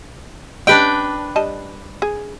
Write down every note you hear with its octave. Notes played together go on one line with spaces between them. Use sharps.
C#4 D4 G4 B4 D#5 G5
G3 D#5 A5
G#4